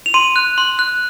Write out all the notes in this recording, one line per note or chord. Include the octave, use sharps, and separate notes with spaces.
F7
C6 D#7
F#6
C6
F#6